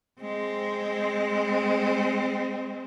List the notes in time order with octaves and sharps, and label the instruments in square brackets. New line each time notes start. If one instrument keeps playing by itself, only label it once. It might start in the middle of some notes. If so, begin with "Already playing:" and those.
[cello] G#3 C4